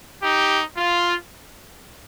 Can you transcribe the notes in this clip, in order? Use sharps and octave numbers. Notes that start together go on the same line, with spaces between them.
D#4 G4
F4